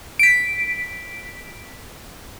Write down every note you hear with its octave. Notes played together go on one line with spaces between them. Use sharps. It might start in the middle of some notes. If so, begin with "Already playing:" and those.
B6 D7